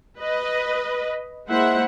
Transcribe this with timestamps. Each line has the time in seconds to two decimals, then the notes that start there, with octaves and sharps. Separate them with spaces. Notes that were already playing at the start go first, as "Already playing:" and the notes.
0.19 B4 D#5
1.48 G#3 A#3 E4 C5 E5 F#5